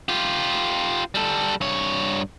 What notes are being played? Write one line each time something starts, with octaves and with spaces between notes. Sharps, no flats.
F4 G4
G3 A4
G2 C#5